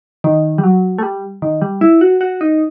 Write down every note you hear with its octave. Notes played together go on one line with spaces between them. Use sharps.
D#3
G3
F#3
A3
G3
D#3
G3
E4
F#4
F#4
D#4